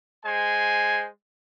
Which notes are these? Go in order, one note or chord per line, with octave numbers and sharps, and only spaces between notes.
G#3 C5 G#5